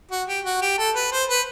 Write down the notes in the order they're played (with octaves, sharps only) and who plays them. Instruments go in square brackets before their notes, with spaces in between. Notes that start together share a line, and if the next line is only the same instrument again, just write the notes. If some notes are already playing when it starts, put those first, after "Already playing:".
[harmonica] F#4
G4
F#4
G4
A4
B4
C5
B4